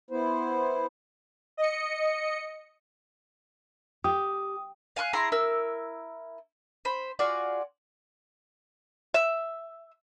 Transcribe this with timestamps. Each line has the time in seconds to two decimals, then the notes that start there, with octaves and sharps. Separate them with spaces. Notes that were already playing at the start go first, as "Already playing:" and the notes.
0.10 B3 E4 C5
1.57 D#5 C#7
4.04 G4 D#6
4.96 F5 G#5 C#6 F#6
5.13 E4 G#4 A#5 C6
5.32 E4 A#4 E6
6.85 C5 B5
7.19 F4 F#4 G#4 D5
9.14 E5